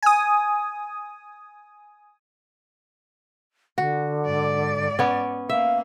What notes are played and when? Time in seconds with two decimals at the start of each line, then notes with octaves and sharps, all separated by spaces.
0.02 G#5 D#6
3.78 D3 F#4
4.26 G#2 D5
4.99 B3 C#4
5.50 A#3 E5 F5